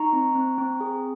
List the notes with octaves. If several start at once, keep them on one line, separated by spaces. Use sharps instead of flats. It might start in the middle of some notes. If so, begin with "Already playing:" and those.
Already playing: D#4 A#5 C#6
C4
C4
C4
G#4